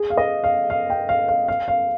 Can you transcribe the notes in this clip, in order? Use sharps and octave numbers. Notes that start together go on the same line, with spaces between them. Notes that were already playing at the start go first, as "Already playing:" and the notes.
Already playing: G#4
F5
D#5
F5
F5
G5
F5
F5
F5
F5